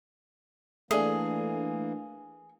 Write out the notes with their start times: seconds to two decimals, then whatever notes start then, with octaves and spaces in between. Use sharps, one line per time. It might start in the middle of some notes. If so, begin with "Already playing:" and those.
0.91 E3 A3 A#3 D4 G#4